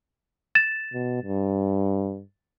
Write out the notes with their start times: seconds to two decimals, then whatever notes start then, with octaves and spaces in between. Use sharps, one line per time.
0.55 A6 E7
0.93 B2
1.23 G2